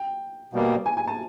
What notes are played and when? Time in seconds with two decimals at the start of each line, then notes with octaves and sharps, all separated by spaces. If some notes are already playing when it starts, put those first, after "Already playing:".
Already playing: G5
0.53 B2 G3 A#3
0.86 G#5
0.97 G#5
1.07 A5